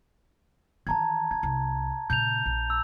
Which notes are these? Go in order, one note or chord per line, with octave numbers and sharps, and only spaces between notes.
D#3 E3 A5 A#5 G#6
D#3 G#6
C2
A#2 C#3 G6 F7
A#1
E6